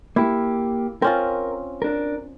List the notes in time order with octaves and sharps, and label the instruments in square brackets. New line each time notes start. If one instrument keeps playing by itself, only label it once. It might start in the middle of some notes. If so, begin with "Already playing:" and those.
[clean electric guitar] A#3 G4 [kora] E4
[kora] C4 C#4 F4 [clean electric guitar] A#4
[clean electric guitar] D4 A#4